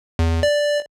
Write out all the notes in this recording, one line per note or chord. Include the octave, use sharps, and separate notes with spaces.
E2
D5